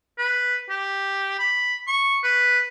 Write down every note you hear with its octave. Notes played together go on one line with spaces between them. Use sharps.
B4
G4
B5
C#6
B4